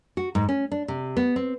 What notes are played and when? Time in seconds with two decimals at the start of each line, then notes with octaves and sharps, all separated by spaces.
0.17 F#4
0.35 G#2
0.49 C#4
0.72 D4
0.88 C3
1.17 B3
1.36 C4